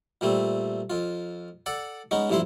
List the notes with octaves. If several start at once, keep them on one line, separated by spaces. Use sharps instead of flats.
A#2 G3 A3 C4
F2 F4
A4 D5 F#5 A5
G#3 B3 C#4 D#4
A1 G2 F3 E4 E5 C6